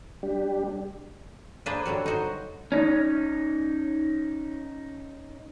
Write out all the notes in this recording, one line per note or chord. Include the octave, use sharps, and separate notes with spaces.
G3 D4 G4
A#3 D4 G#4 B4 C5
D3 F#3 G3 F#4
D#4 F#4 C5
C#4 D#4